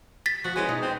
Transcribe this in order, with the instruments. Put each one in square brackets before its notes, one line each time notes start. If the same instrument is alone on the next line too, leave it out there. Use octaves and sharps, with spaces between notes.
[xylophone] A6 B6
[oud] F3 [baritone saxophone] F#4
[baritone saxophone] G#3 [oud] B3 C#4 E4
[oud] B2 D#4 D#5
[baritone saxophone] C4